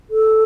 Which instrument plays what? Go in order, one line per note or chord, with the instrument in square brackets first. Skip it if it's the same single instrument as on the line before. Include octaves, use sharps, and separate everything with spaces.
[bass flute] A4